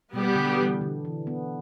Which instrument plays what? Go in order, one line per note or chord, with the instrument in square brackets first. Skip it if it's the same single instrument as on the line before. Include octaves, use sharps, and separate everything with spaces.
[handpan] B2 [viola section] G3 B3 G4
[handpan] D3
E3
D3
E3
B3